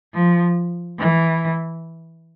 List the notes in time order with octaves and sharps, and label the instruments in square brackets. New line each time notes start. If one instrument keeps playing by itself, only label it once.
[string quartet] F3
E3